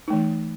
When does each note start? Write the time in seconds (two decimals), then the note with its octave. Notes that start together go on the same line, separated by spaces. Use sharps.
0.08 D#4
0.10 A3
0.13 E3